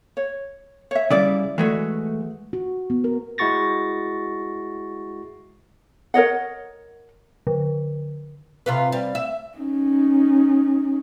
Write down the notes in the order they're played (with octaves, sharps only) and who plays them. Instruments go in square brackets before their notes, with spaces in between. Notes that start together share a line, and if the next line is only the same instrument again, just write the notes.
[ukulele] C#5
C#5 E5
[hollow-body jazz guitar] C#3 G3 [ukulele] E4 D5
[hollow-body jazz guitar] E3 G#3 A3 [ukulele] F#4
[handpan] F#4
B3
A#4
[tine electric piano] G#3 E4 F#4 C#6 A6 A#6
[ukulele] A#4 C#5 D#5 F#5
[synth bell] D3
[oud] C3 F4 B4
G3
E5
[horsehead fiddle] C#4 D#4